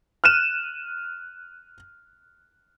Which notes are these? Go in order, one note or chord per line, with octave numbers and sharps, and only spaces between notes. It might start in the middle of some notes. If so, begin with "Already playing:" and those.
F6 F#6 D#7 E7